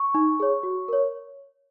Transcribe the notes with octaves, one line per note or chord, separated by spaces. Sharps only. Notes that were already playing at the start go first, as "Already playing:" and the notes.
Already playing: C#6
D#4
G#4 C#5
F#4
A#4 C#5